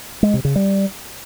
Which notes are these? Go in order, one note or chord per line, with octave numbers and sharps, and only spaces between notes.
G#3
C3
C#3
G3